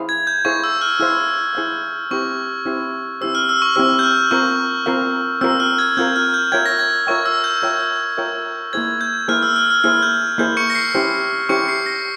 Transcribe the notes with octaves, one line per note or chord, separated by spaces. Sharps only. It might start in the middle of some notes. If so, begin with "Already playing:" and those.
Already playing: E4 G#4 C5 F5
G#6
G6
E4 G#4 C5 F5 C#6
E6
F6
E4 G#4 C5 F5 E6
E4 G#4 C5 F5
C4 E4 G4 C5 C#6
C4 E4 G4 C5
C4 E4 G4 C5 E6
F6
E6
C#6
C4 E4 G4 C5 E6
G6
F6
C4 F4 A#4 F5 C#6
C4 F4 A#4 F5
C4 F4 A#4 F5 E6
F6
G#6
C4 F4 A#4 F5 G6
F6
G6
F4 A#4 C#5 E5 G5 G#6
A#6
G#6
F4 A#4 C#5 E5 G5 C#6
E6
G6
F4 A#4 C#5 E5 G5
F4 A#4 C#5 E5 G5
A#3 E4 G#4 C5 G#6
G6
A#3 E4 G#4 C5 F6
E6
F6
F6
A#3 E4 G#4 C5 F6
G6
A#3 E4 G#4 C5 G6
C#6 C#7
A#6
C7
C#4 E4 G4 C5
C#4 E4 G4 C5 C#6 C#7
C7
A#6